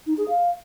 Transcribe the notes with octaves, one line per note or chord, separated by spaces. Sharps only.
D#4
G#4
F5